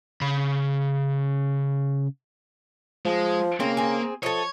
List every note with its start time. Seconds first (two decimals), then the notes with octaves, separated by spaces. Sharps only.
0.21 C#3 B5
3.05 F3 G#3
3.60 C#3 A#3 C4
3.77 C4 G#4
4.23 F3 A4 C#5 D#5